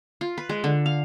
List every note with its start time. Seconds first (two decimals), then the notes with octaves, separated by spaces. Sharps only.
0.21 F4
0.38 B4
0.49 G#3
0.64 D3
0.86 F5